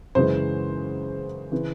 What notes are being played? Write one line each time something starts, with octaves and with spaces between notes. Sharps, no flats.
F#2 C#3 E3 G#3 C5
C#3 E3